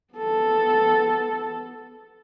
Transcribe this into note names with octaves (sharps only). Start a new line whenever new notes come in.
B3 A4